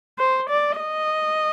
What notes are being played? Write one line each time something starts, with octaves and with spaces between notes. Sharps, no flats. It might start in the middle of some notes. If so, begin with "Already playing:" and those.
C5
D5
D#5